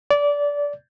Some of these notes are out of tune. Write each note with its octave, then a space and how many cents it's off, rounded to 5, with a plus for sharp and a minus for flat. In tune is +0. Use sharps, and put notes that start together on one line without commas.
D5 -20